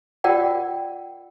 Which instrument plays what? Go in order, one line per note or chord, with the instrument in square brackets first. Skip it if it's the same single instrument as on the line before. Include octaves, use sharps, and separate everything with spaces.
[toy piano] F4 A#4 D5 F#5 G5